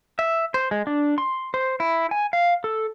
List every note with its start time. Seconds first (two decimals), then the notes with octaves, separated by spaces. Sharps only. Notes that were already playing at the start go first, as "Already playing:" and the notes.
0.19 E5
0.54 C5
0.71 G#3
0.87 D4
1.18 C6
1.54 C5
1.80 E4
2.11 G#5
2.33 F5
2.64 A4